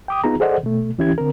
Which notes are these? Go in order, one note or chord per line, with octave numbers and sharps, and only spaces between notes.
G5 D6 D#6
B3 D#4 F4 G#4 A#5
G#4 A4 C5 D5 D#5 F#5
B2 A3
D2 E3 C#4 E4 G4 G#6
D3 C4 A#4